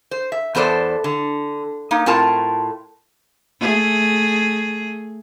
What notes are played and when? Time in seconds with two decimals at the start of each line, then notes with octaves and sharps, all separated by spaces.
0.11 C5
0.32 E5
0.55 E2 B3 A4 C5 D5
1.04 D3
1.91 A#3 D#4
2.06 A2 C4 F4 A#4 A5
3.61 A3 G#4